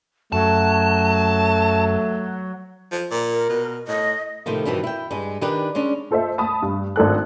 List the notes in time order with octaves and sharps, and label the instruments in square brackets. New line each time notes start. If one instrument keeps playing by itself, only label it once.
[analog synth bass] F#2 [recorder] F#3 [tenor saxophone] A3 [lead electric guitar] A5
[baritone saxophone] F3
A#2
[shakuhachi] A#4
[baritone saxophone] B2
[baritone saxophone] A2 [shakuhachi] D#5
[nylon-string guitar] A2 C3 D#3 F3 A3
G2 B2 D#3 E3 C4
E4 G5
G2 G#3
D#3 D4 D#4 G4 B4
G#3 C#4 D4
[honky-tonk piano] F4 A4 C5 D#5 E5
A5 B5 D#6
G2
G#1 D4 A4 F#6